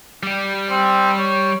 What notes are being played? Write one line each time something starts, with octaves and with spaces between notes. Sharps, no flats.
G3 G4
C4
C#5